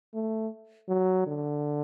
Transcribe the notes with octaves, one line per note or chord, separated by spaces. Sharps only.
A3
F#3
D3